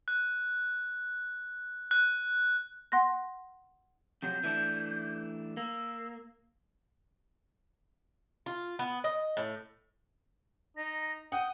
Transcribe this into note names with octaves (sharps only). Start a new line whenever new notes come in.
F#6
F#6
F#5 C6 F#6 A#6
F2 C3 F#3 G6
E3 A3 D4
A#3 E6
F4
B3
D#5
A2
D#4 A#6
F#5 G5 D#6